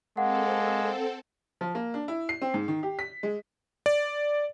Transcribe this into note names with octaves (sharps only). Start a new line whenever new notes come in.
G#3 A#3 C4 A4 F#5
F3
A#3
D4
E4
C7
C4
G#2
D#3
G4
B6
G#3
D5